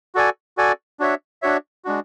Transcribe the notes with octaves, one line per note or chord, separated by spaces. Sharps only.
F#4 A4 D5 G#5
F#4 A4 D5 G#5
D4 F#4 C#5 E5
D4 F#4 C#5 E5
G#3 D4 F#4